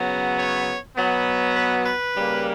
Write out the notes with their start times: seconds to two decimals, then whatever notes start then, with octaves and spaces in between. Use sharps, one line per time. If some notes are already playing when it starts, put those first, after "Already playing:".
Already playing: C#3 F#3 B3
0.37 C#5
0.96 B2 F#3 B3
1.55 B4
1.84 B4
2.14 C#3 G3 A#3